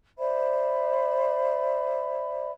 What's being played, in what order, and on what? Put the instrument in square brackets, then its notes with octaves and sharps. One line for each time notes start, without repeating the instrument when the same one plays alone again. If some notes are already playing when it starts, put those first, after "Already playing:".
[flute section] C5 D5 E5 B5